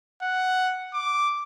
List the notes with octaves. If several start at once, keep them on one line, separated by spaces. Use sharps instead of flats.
F#5
D6